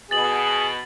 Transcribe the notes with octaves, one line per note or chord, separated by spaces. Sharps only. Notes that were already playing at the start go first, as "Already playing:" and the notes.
B2 G#4 A6 F#7